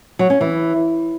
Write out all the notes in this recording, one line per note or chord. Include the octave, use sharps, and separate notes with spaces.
F#3
C#4
E3